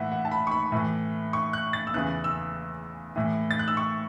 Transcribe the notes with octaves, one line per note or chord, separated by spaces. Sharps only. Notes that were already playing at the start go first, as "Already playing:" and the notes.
Already playing: A2 E3 E5 F#5
F#5
A5
B5
C#6
B5
A2 E3
C#6
F#6
A6
E6
E2 C#3 E3 F#6
E6
A2 E3
A6
F#6
E6
C#6